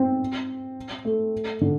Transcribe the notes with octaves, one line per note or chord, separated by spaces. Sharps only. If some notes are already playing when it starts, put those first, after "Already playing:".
Already playing: C4
A3
D3